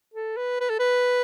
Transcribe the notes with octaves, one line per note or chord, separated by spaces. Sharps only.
A4
B4
B4
A4
B4